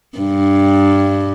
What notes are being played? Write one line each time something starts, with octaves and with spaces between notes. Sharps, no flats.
G2